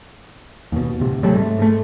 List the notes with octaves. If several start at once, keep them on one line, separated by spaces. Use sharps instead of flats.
D#2 B2
D1 C3
C3 F#3 G3 A3
G#2 A3
G#2 A3